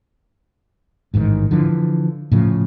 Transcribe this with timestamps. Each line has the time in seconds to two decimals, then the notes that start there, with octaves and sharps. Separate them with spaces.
1.14 A1 G#2 D3 D#3
1.51 D3 E3 F3
2.32 A2 C#3 F3